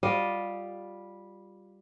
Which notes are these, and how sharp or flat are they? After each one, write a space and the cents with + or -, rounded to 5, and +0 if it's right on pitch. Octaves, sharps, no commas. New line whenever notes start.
G3 +0 F4 +10 D#5 +0